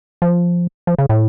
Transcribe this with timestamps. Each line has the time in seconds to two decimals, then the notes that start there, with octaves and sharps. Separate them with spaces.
0.22 F3
0.87 F3
0.98 C#3
1.09 A2